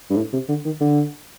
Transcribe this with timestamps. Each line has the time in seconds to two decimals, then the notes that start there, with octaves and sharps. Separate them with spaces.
0.10 G2
0.16 A2
0.33 C3
0.49 D3
0.65 D#3
0.81 D3